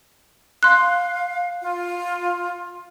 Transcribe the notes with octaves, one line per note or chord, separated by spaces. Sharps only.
F5 C6 F#6
F4